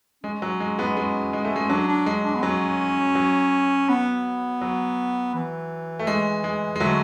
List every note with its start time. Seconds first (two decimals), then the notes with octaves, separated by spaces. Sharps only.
0.24 G#3 C#4
0.42 F#3
0.60 G#3
0.79 G#3 B3
0.97 G#3
1.33 G#3
1.45 A3
1.56 G#3
1.69 F#3 D4
1.88 D4
2.06 G#3
2.25 D4
2.35 B3
2.42 F#3 C#4
3.15 F#3
3.89 B3
4.61 F#3
5.34 E3
5.99 A3
6.07 G#3
6.44 G#3
6.76 G#3
6.80 D3 F#3 A3